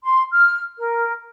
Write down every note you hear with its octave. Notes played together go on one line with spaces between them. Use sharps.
C6
F6
A#4